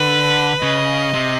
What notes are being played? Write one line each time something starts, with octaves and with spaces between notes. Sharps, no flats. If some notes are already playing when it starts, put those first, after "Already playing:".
Already playing: D3 B4
C#3 D#5
C3